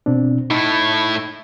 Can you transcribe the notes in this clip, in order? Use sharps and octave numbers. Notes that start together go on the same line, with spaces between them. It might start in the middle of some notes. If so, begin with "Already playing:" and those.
B2 C4 D4
A2 D#4 E4